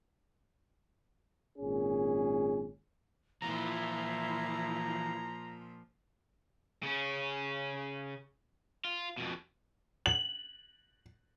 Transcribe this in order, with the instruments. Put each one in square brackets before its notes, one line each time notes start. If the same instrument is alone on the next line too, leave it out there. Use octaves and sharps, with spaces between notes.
[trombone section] G#1 A#2 C#4 G#4
[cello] A#2 F3 [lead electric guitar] E3 F4 [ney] E4 [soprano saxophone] A#5
[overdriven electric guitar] C#3 C#4
F4
F2 B2
[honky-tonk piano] F#7